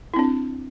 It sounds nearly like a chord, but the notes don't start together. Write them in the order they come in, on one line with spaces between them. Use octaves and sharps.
E4 C4 D4